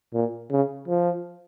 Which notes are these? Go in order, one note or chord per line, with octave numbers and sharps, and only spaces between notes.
A#2
C#3
F3